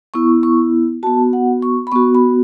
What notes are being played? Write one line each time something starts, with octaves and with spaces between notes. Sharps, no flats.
B3 E4 C#6
C#6
B3 F#4 A5
F#5
C#6
B5
B3 F#4 C#6
B5